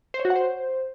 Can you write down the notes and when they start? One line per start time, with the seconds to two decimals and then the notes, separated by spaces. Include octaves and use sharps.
0.14 C5
0.19 C#5
0.25 F#4
0.30 F#5
0.36 C5